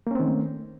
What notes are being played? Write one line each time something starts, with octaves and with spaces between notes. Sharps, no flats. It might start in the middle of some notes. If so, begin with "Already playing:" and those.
D#3 A3 A#3 C4 C#4